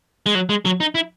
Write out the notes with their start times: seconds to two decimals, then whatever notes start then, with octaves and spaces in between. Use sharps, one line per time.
0.26 G#3
0.35 F#3
0.49 G#3
0.65 F#3
0.80 D#4
0.95 E4